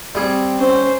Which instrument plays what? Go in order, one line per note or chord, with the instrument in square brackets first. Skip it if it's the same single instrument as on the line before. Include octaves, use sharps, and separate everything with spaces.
[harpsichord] G3 G#4 [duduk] C4
[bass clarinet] C#4 [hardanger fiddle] C5